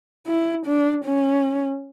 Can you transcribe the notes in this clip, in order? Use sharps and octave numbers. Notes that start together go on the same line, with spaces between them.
E4
D4
C#4